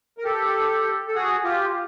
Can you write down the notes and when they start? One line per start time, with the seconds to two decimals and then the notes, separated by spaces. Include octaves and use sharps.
0.18 A#4
0.24 G4 A4
1.08 A4
1.15 F#4 G#4
1.44 F4 G4